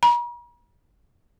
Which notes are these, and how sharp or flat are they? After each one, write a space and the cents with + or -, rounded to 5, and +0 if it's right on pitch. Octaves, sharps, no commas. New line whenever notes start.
A#5 +45